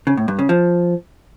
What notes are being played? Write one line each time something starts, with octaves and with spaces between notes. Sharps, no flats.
C#3
A2
G2
C#3
F3